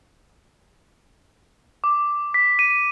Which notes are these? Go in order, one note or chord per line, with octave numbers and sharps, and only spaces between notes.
D6
B6
D#7